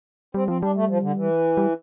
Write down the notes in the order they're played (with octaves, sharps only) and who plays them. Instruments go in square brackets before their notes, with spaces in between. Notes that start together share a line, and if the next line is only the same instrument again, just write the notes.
[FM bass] G3 [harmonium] C4
[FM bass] F3 [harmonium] C4
[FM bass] G3 [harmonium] D4
[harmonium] A3
F3
D3
E3
[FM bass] G3